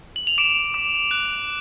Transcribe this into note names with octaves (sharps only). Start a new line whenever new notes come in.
F#7
F7
D6 D7 E7
D6
F#6